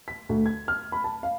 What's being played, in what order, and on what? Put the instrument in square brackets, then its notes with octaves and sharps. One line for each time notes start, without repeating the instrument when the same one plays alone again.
[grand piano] B6
D2
G#6
F6
B5
A5
F5